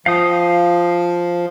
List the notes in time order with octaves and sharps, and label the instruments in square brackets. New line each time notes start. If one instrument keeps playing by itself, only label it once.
[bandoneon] F3 [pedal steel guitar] F5 G5 D#6